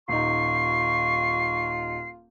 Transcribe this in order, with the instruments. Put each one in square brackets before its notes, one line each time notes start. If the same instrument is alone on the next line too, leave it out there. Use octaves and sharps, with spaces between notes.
[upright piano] D#1 D#4 [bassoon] F4 [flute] C#6 [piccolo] C7